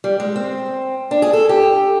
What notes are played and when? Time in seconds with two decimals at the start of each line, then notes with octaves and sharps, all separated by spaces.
0.04 G3
0.20 G#3
0.36 C4
1.11 D4
1.22 G#4
1.33 A4
1.49 G4